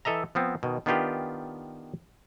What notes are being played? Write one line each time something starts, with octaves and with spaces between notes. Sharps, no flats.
E3 A4 D#5 E5 A#5
F3 B3 C4
B2 D#3
D#3 B3 D4 F4 G4 B4